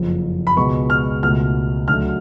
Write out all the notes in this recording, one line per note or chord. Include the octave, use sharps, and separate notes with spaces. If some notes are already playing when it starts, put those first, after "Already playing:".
Already playing: F#1 F2 F3
B5
C#2 B2 G#3 B3 C#6
F6
C#2 B2 A3 F6
D2 D3 F#3 A3 F6